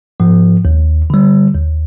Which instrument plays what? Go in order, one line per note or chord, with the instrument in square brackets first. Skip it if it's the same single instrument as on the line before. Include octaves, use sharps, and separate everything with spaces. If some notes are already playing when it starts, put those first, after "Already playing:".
[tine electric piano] G#2 F3
D#2
D3 G3
D#2